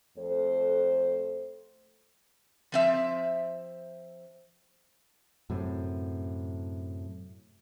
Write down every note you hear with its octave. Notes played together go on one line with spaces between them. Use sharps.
F2 A3 A4 C5
F3 C4 E5
F#2 A2 C3